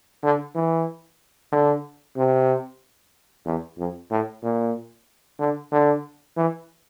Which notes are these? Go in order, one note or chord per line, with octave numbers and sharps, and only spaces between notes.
D3
E3
D3
C3
E2
F2
A2
A#2
D3
D3
E3